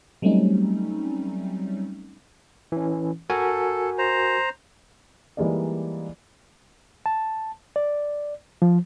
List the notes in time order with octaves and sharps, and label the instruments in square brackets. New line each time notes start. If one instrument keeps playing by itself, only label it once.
[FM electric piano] F#3 G3 A3 C4 C#4 D#4
[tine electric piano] E3 C#4
[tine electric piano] F#4 A#4 G#5 [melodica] A4
[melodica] C5 A#5
[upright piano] E3 G3 G#3 A#3 D#4 D5
[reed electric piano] A5
D5
F3